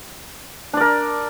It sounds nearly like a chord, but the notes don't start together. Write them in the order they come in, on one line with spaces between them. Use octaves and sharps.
D4 D5 A#4